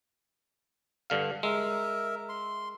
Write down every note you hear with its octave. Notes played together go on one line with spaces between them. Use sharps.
G2 D3 F5
G#3 A#4 E5
C6